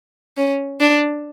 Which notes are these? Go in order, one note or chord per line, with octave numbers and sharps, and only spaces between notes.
C#4
D4